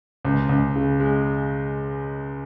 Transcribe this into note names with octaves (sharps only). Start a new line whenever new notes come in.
C#2
C#2
C#3
G#3